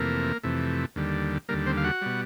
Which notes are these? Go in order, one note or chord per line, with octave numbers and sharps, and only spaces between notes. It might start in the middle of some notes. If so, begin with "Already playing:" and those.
Already playing: F2 C3 E3 A3 A#3 A#4
F2 C3 E3 A3
D#2 D3 G3
D#2 D3 G3 A#3 A#4
C4 C5
F5
F#4 F#5
B2 G3